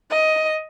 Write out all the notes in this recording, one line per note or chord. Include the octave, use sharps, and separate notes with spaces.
D#5